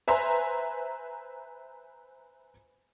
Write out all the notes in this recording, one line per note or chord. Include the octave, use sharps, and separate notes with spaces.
B4 C5 E5 G#5 A#5 C6